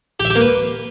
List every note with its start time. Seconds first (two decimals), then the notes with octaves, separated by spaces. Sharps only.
0.20 G4
0.25 E5
0.30 G4
0.36 A#3
0.41 B4